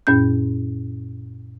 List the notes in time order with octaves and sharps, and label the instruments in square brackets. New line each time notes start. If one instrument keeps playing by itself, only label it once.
[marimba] F#2 A#2 C#4 G6